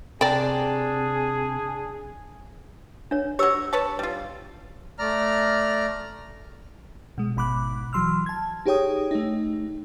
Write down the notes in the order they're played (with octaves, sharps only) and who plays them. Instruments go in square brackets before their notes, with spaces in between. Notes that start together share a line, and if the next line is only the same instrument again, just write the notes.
[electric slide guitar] C3 [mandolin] D4 A5 A#5 [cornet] G#4 [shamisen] D5 G5
[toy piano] D4 C#5
[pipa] F#3 C#5 [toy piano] G4 E6
[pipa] B4 C#5 A5
G3 F4
[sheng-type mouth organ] A3 D5 A#5 F6
[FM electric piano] B2 G#3
G#1 B2 B5 D6 F#6
E3 F#3 C6 E6 F6
A5 G#6
D#4 G4 G#4 C#5 G5 D#6
A3 D#4